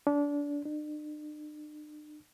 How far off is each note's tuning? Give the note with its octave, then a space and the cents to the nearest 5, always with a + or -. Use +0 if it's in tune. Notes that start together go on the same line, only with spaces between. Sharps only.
D4 -25
D4 +45